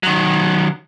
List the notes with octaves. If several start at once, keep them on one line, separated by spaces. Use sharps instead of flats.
D#3 F#3